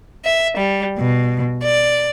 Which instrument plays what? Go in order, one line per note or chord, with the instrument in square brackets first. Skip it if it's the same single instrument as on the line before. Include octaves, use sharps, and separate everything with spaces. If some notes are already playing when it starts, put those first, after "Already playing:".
[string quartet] E5
G3
B2
D5